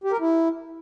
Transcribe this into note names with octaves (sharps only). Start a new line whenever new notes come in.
G4
A#4
E4